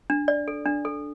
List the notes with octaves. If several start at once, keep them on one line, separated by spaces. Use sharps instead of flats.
D4
D5
A4
D4
A4